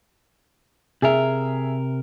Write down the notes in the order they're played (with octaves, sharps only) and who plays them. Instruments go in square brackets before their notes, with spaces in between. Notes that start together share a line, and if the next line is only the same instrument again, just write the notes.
[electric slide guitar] C3 A#4 [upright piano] G#4 E5